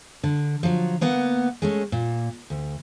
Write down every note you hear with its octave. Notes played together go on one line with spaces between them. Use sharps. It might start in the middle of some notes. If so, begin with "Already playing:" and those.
D3
F3 F#3
A#3 B3 F#5
G#3 A3 C#4
A#2
D2